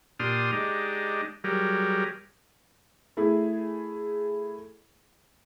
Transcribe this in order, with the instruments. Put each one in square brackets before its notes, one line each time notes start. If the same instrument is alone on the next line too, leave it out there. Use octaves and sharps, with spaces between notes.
[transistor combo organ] A#2 D4 G4 C6 D#6 F6
G#3 D4 D#4 G4
F#3 G3 G4 G#4 A#4
[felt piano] A3 E4 G#4